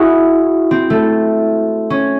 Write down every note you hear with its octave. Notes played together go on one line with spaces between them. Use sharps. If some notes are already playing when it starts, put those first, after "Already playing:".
Already playing: E4 F#4 G#4
C4
A3
C#4